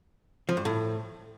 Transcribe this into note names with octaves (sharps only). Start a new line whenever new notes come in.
F3
G2
A2